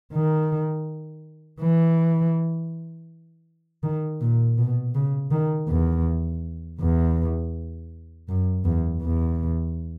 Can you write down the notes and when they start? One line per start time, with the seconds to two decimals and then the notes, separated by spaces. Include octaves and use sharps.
0.13 D#3
1.60 E3
3.83 D#3
4.21 A#2
4.58 B2
4.95 C#3
5.31 D#3
5.69 E2
6.80 E2
8.29 F#2
8.65 E2
9.02 E2